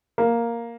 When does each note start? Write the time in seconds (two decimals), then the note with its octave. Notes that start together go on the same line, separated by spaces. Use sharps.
0.18 A#3